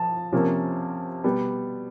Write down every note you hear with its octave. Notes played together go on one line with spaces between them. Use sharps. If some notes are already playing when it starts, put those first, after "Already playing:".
Already playing: F3 A5
C3 F3 A#3 C#4
B2 G3 B3